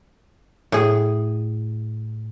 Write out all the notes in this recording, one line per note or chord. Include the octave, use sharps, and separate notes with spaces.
A2 G#4